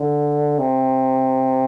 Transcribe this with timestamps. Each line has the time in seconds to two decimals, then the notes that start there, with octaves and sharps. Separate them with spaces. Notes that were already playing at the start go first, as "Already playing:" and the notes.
Already playing: D3
0.59 C3